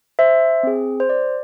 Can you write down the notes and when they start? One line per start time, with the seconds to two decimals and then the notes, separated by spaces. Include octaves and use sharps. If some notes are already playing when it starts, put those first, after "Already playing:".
0.19 C5 E5
0.63 C4 G#4
1.00 C5
1.10 D5